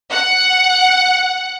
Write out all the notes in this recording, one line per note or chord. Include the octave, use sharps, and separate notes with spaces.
F#5